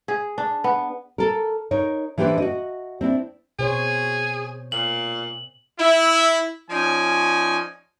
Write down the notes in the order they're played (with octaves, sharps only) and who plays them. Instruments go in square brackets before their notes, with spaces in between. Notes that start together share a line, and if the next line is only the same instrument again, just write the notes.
[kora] G#4
D4
B3
[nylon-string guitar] A4 A#4
D#4 A#4 C#5
E3 D4 G4 B4 C5
F#4 D#5
C4 D4 E4
[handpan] B2 C5 C#5 [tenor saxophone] G#4
[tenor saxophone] A#2 [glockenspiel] F#7
[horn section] E4
F3 C#4 D#4 D5 G#5